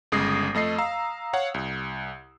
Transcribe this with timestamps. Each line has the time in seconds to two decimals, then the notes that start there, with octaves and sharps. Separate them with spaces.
0.12 G1 C#3 G#3 D#6 A#6 C7
0.54 F2 A3 D#5 C7
0.78 F5 A#5 E6
1.33 C#5 F5 F#5
1.54 C2